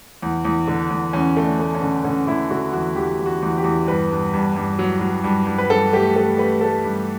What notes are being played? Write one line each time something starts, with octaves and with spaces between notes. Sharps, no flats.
E2
E2
D3
E2
E2 C#4
A3
D4
A3
C#4
D3
D3 C#4
D3 E4
D3 F#4
E2 F#4
E2 G4
E2
F#4
E2
G4
E2
G2 B4
G2
G2
G2
F#3
F#3
G2
G2
B4
G2 A4
A3 G4
A3 A4
A3 B4
A3 A4
G2